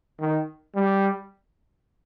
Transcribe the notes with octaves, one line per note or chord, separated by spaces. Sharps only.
D#3
G3